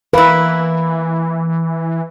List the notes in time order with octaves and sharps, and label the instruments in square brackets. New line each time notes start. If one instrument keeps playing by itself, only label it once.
[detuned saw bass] E3 [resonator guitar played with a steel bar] A#3 E4 [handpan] B4